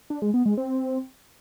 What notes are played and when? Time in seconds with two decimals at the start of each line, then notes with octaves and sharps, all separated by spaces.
0.10 D4
0.22 G#3
0.34 B3
0.46 G#3
0.57 C4